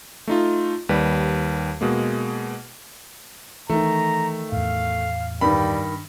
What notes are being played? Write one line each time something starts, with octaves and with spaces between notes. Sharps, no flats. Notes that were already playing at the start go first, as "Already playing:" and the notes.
A3 D#4 F4
D#2 G3 B4
B2 G#3 A#3
D#3 E3 A3 A#5
E2 A2 F5
G2 D#3 G3 B5